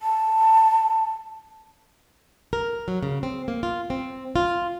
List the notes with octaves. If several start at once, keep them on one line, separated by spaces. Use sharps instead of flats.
A5
A#4
F#3
C#3
C4
A#3
F4
C4
F4